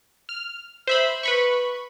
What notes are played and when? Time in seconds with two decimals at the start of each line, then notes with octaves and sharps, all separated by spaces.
0.29 F6
0.87 C5 E5 B5
1.23 B4 B5 C#6